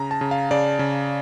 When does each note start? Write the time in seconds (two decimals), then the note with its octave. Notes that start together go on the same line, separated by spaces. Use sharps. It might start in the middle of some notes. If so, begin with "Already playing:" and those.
Already playing: C#3 A#5
0.11 A5
0.21 C#3
0.31 F5
0.51 C#3 D5
0.79 C#3